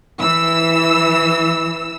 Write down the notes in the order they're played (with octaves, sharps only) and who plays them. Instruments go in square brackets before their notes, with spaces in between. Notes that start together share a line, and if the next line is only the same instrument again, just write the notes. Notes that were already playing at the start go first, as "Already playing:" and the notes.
[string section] E3 E6